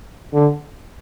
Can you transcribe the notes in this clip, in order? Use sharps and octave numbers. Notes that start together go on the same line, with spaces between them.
D3